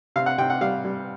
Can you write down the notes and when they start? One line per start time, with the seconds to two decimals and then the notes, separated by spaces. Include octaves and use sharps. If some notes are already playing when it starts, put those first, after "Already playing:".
0.16 C3 F5
0.26 F#5
0.38 C3 G5
0.50 F#5
0.61 G3 F5
0.85 G3